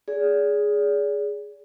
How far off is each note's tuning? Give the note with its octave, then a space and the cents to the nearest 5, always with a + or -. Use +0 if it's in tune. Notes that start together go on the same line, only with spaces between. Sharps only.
G#4 +0 D5 -35